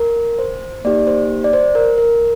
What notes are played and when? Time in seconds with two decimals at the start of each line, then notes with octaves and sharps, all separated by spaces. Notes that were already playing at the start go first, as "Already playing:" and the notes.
Already playing: A#4
0.39 C5
0.85 A#3 D#4 G4 D5
1.07 C5
1.44 D5
1.53 C5
1.75 A#4
1.98 A#4